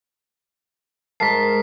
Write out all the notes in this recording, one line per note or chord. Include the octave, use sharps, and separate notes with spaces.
G#2 A#4 A5 B6 C7